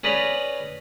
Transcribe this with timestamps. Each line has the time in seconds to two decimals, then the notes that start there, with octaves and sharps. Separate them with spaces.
0.04 C#4 G#4 B4 D5 A#5 B5